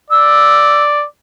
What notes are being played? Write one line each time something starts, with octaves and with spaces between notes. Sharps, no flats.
D5 E6